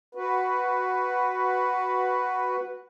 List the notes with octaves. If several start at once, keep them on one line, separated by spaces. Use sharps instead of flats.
F#4 B4